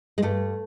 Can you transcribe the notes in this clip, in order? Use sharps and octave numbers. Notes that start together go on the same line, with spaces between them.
G#3
G2 A3